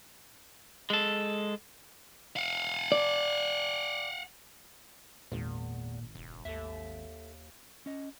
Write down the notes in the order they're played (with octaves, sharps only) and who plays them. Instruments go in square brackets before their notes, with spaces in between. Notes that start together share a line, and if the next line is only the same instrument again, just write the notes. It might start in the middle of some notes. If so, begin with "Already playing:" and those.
[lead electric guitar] G#3 A4
F5 F#5
[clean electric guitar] D5
[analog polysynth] G#1 [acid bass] E2 [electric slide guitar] A#2
[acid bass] E1
[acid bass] D#2 [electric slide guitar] A4 E5
[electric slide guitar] C#4 D#5